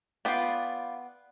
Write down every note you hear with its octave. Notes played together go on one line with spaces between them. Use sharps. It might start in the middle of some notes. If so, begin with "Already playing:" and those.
B3 F4 D5 G5